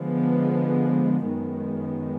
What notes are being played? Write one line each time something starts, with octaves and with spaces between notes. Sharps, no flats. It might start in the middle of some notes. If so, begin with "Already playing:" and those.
Already playing: D3 F3 G#3 B3
F#2 D#3 G#3 B3